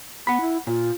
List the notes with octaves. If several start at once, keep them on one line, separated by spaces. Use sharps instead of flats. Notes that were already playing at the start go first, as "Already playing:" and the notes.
B3 F#5 B5
E4
A#2 F4